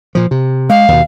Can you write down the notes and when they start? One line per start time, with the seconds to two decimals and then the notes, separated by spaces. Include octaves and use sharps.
0.15 A#2 F3
0.31 C3
0.70 G#3 F5
0.88 D#2 B2